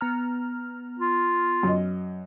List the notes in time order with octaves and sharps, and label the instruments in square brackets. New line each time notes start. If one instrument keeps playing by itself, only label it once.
[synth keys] B3 A#5 F6
[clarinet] F4
[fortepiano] F#2 D#5